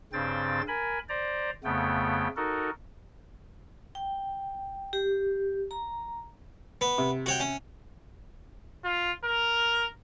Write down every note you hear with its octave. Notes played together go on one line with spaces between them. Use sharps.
G2 C#3 C4 C5 G5 A6
A#4 G#5 B5
C5 D5 A#5
F2 C#3 A3 B3 G5
D#4 F#4 A4 A#4
G5
G4
A#5
B3
C3
F#4 C#5 G5
C#4
F4
A#4